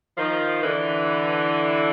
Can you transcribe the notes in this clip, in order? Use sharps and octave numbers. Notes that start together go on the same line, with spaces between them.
D#3 F3
D3 E3